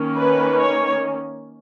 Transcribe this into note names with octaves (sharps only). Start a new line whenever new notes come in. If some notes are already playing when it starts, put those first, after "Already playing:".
Already playing: D#3 A#3 C#4
B4
C#5